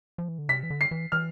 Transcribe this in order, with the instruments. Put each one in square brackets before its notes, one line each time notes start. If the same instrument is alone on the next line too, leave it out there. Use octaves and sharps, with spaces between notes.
[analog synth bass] F3
E3
D3
[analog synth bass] C3 [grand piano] B6
[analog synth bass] E3
D3
[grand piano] C7
[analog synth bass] E3
[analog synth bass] E3 [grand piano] F6